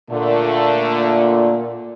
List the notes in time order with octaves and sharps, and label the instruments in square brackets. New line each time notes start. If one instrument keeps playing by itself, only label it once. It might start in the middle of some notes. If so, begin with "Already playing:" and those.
[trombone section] A#2 [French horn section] D3 A3